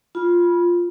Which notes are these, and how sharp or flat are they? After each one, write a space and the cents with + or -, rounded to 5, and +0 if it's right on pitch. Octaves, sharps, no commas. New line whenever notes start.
F4 +0 B5 -20